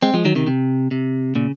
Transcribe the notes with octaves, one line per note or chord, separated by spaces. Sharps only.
G#3 C4
F3 G#3
D#3 F#3
C3 D#3
C3
C3
A#2 C#3